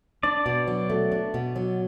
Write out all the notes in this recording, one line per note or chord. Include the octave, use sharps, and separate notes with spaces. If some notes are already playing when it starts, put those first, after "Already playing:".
D4 D5
B2
F#3
A3
D4
B2
F#3